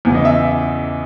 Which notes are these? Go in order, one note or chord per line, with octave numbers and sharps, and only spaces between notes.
E2 C#3 E3
D#5
E5
E5